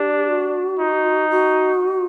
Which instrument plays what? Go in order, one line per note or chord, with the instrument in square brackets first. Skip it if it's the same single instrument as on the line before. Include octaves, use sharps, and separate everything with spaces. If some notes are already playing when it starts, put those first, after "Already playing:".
Already playing: [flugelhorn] D4 [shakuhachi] G4
[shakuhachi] F#4
[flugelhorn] D#4
[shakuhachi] F#4